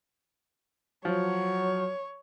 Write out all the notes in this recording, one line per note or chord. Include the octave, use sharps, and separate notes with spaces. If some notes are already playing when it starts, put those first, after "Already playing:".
F3 F#3 C#5